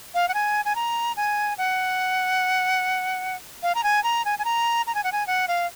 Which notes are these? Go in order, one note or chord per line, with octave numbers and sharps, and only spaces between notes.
F5
F#5
G#5
G#5
A#5
G#5
F#5
F5
A#5
G#5
A#5
G#5
G#5
A#5
A#5
G#5
F#5
G#5
F#5
F5